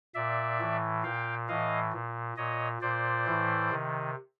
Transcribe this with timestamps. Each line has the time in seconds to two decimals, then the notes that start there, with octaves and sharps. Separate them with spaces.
0.15 A#2 D5 E5
0.59 A2 E3
1.04 A#2 F5 G5
1.48 A2 E3 D#5 F5
1.93 A#2
2.37 A#2 C#5 D#5
2.82 A#2 C5 D5
3.26 A2 E3
3.71 C3 D#3